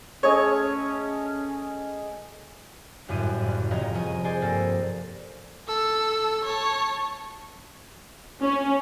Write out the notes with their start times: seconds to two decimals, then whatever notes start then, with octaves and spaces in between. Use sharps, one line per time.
0.23 A3 C#4 G#4 C#5 D#5
3.08 G1 F#2 A2 G3 D#7
3.43 F#1
3.71 F1 C#5 D#5 A#5
3.94 F3 G#4 D#5 C#6 D#7
4.24 G#4 C5 D5 D#5 G#5
4.42 G2 A#3 A4 A#6
5.67 A4 E6
6.44 C#5 A5
8.42 C#4